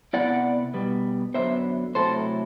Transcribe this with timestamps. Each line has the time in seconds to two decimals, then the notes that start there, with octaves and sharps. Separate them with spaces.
0.13 C3 G3 B3 E4 D5 F#5
0.74 B2 G3 B3
1.34 F#2 D3 F#3 B3 C5 E5
1.95 C3 F#3 A3 E4 A4 C5